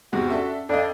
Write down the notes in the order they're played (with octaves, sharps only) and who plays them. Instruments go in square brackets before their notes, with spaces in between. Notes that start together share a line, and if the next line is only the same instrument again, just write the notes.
[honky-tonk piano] E2 G#2 C3 [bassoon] F#4
[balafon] C#4 [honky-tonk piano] D4 A4 E5
[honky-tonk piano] F2 D#5 [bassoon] D4 [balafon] A4 D5 F5